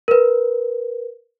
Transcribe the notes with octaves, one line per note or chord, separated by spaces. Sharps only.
A#4 B4